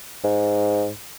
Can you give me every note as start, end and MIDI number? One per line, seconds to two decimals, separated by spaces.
0.24 0.91 44